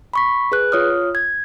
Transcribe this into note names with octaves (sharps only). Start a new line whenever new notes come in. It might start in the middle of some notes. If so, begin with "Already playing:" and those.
B5 C#6 B6
G#4 B4 F#6
F4 C#5 D#6 F6
G#6